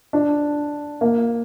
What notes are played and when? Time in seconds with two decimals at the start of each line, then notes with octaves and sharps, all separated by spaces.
0.13 D4
1.01 A#3